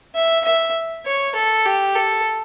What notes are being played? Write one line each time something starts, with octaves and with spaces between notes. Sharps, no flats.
E5
E5
C#5
A4
G4
A4